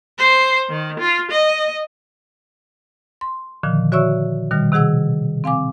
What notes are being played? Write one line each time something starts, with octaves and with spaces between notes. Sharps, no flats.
C5
D#3
F4
D#5
C6
A#2 D3 D#3 F3
F#4 C#5 D5 E5 C#6 E6
B2 D#3 G3 F6
C3 D#3 G#4 F#5 E6
C4 F5 G#5 D6